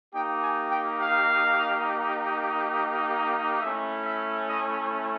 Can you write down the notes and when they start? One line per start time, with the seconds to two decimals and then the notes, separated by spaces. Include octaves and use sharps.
0.14 A#3 D#4 G4 G5
0.43 G#5
0.72 G5
1.01 F5
3.61 A3 C#4 E4 E5
4.05 E5
4.49 D#5